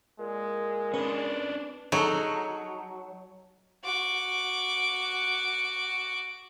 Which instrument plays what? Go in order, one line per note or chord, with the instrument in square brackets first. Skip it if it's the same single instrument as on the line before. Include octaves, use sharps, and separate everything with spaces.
[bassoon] A#2 [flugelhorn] G#3
[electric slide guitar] C#4 D4 [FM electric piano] B4
[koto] F#3 [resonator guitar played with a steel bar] D#4 [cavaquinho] G#4 A4
[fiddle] F#4 D6